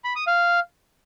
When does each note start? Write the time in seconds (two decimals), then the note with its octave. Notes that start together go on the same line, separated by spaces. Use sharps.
0.04 B5
0.16 D#6
0.27 F5